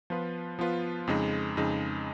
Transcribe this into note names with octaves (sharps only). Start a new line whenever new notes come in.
F3 B3 F4 B4
F3 B3 F4 B4
F2 C#3 G#3 D#4
F2 C#3 G#3 D#4